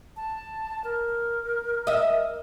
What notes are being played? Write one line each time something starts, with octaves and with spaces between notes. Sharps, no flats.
A5
A#4
D#5 E5